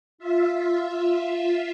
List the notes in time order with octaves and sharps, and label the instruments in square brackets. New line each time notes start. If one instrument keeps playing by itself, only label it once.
[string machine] F4 E5